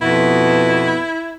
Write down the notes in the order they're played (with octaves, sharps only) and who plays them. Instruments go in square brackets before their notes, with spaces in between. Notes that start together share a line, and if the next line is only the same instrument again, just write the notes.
[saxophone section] F2 B2 [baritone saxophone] E4